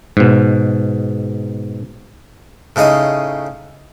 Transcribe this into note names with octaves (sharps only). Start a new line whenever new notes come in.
G#2 B2
A2 C#3 D#4 D#5 D#6